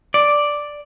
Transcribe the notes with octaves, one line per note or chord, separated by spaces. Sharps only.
D5